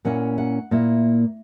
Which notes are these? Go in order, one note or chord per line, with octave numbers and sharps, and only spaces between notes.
A#2 A#3 C#4 E4 F#5
F#5
A#2 A#3 E4